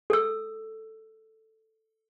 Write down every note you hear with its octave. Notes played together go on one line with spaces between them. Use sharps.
A4 E6